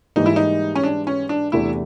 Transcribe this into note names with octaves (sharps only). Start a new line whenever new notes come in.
G#2 E3 G3 A#3 D#4
E4
D#4
C#4
D4
C#4
D4
E2 C3 E3 A3 D4 E4